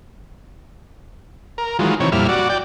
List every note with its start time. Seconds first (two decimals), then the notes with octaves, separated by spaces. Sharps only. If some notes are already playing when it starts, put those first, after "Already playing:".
1.58 A#4
1.79 D#3 E3 F#3 G#3 F4
2.00 C3 D#3 E3 C#5
2.12 F2 A#2 G3 E4 F6
2.29 F#4 D5
2.49 D5 G5